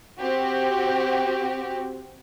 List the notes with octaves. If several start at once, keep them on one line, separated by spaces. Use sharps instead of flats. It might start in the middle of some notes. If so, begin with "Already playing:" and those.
C4 F#4 G4